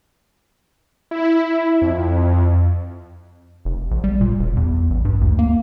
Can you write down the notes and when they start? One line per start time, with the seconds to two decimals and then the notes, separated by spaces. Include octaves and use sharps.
1.11 E4
1.82 F2
3.65 F1
3.91 A#1
4.04 G3
4.21 A#2
4.39 E1
4.57 E2
4.90 A1
5.05 G2
5.21 D2
5.39 A#3